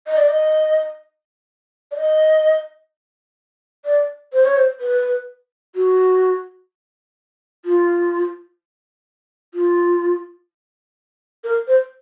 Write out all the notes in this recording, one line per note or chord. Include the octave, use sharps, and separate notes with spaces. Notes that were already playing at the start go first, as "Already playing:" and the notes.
D#5
D5
D#5
D5
D#5
D5
C5
C#5
C5
B4
F#4
F4
F4
A#4
C5